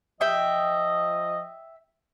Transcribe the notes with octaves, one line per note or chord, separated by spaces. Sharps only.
F3 D#5 E5 G5